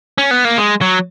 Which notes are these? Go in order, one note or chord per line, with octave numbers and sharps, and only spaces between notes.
C#4
B3
A#3
G#3
F#3